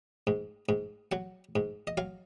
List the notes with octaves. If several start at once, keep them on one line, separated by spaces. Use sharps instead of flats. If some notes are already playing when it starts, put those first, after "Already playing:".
G#2
G#2
F#3 F#5
G#2
D#5
F#3 F5